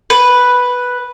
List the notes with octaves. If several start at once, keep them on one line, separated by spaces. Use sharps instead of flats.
B4